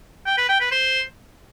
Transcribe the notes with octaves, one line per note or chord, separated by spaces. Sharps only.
G5
B4
G5
B4
C5